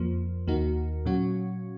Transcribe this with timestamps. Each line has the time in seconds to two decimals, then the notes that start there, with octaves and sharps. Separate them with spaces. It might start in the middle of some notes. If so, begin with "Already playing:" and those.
Already playing: F2 F3 A#3
0.47 D#2 D#3 A#3 D#4 F#4
1.05 A#2 F#3 C#4 F#4